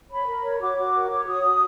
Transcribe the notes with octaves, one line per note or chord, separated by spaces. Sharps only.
C#5 B5
A#4
C#5
F#4 D6
F#4
A#4
C#5
F#4 D#6
F#4